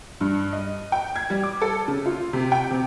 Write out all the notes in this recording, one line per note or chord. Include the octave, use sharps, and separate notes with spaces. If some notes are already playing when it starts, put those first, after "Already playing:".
G2
D#5
G5
G#6
G3
D6
A4
C#3
F4
C3
G5
C3